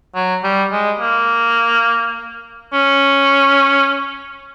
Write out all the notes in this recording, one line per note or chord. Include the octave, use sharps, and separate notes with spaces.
F#3
G3
G#3
A#3
C#4